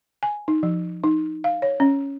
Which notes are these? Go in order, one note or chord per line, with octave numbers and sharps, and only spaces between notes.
G#5
D#4
F3
D#4
F5
C#5
C#4